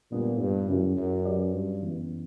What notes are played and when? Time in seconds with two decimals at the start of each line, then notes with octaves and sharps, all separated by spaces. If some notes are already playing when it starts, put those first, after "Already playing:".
0.11 A#2 G3 B3 D4
0.40 G2
0.68 F#2 C#3 F#3 C#4 E4
0.97 F#2
1.25 F#3 C#4 G4 B4 D5
1.53 G2
1.82 F#2 E3 B3